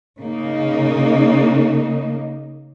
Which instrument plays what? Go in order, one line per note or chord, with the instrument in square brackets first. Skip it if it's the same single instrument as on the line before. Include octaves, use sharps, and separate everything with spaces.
[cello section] C#3 A#3 D#4